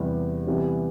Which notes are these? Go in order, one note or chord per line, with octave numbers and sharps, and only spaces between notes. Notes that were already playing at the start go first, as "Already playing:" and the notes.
Already playing: E2 C3 G3 B3
C3 E3 G3 B3